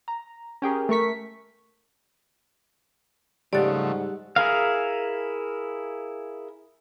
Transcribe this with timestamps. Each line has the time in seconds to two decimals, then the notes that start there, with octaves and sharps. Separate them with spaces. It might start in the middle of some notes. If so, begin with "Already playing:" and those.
0.08 A#5
0.62 C#4 G4 G#4 A#4
0.89 A3 A#4 C#6 B6
3.53 G#2 C#3 F3 G3 A3 D5 F#5 A6
4.36 E4 G#4 A#4 F5